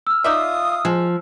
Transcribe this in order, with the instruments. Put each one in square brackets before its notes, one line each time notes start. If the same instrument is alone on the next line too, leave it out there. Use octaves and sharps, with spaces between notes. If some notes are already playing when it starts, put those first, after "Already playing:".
[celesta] E6 F6
[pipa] D#4 D5 E5 [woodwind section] F4 F5 D#6
[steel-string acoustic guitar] F3 [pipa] G#3